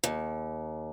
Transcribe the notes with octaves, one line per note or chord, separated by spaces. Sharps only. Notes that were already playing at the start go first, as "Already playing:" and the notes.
D#2